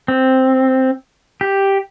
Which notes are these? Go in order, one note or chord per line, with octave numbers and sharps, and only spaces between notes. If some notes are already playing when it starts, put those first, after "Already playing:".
C4
G4